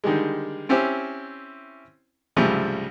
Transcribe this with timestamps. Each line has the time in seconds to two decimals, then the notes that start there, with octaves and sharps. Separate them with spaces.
0.04 D3 D#3 G3 G#3
0.69 C4 C#4 E4 G4 C5
2.37 C2 G#2 C#3 F3 G3 A3